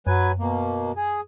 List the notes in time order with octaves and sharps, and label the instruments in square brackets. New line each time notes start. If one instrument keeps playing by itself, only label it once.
[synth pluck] F#2 [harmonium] F#3 B4 G#5
[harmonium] B2 A#3
G#4